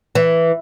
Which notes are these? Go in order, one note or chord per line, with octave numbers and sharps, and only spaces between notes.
E3